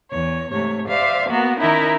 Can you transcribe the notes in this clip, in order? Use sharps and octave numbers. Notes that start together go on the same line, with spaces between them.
E2 C#5
G#2 C3 A3 C#5
C5 D5 E5 F5
A#3 B3 F#4 A#4
D#3 C#4 D#4 E4 A#4 E5